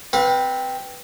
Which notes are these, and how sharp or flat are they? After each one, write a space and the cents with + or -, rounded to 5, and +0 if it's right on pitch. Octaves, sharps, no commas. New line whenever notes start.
C4 +0 B4 -5 F5 +45